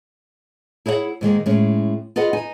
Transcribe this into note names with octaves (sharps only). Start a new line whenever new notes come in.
E4 G#4 C#5 D#5 F#5
G#2 D#3 G#3 A#3
A2 G#3 C#4
F4 G#4 B4 D#5 F#5
D#4 G#5